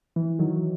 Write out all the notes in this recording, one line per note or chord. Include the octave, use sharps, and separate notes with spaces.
E3
D#3 F#3